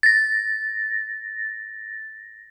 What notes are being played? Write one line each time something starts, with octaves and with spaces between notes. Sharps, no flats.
A6 A#6